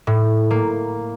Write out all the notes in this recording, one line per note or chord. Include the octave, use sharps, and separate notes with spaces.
A2
A#3